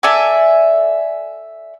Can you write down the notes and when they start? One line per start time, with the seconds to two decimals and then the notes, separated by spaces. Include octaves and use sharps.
0.03 A4 D5 E5 G#5